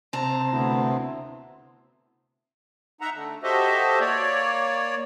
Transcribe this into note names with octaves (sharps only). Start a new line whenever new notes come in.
C3 A5 A#5
D2 B3 E4
D#4 E5 F#5 A#5
D3 A3
F#4 G4 A4 C5 D#5 E5
A#3 C#5 D5